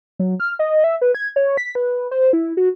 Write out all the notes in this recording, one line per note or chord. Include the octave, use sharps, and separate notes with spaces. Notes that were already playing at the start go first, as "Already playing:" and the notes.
F#3
F6
D#5
E5
B4
G#6
C#5
B6
B4
C5
E4
F#4